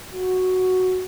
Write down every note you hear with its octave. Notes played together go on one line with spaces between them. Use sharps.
F#4